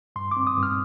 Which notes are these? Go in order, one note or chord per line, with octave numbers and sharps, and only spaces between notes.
G2 C6
C4 D6
D#6
G2
F6